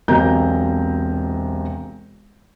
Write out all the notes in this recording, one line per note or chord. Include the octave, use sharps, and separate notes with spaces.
E1 B1 C3 A#5 G6